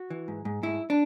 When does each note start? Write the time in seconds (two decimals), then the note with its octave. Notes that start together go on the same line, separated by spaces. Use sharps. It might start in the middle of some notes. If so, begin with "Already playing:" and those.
Already playing: F#4
0.10 E3
0.28 G#2
0.45 G#2
0.63 G#2 E4
0.90 D4